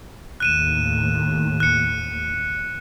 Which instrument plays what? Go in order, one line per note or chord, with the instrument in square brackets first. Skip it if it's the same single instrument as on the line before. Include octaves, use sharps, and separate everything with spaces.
[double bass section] D#2 A2 [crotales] F#6 D#7 E7
[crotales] F#6 C#7